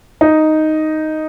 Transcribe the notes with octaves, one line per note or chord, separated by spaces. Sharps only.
D#4